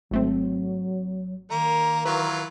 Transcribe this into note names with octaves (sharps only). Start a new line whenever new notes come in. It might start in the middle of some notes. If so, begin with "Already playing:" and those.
G#1 F#3 A3 C4
D#3 A#3 A#5
E3 F#3 F4 B4